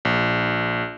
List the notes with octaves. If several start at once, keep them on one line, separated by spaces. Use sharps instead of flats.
A#1